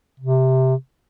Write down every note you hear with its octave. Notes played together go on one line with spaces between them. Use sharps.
C3